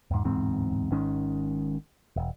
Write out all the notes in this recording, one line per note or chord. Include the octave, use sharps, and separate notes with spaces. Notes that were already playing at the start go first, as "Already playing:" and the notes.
E2 G#2
D1 E2 G#2 C4
G#1 G#2 D#3 C#4
E1